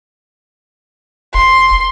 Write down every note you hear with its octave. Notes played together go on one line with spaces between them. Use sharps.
F1 C6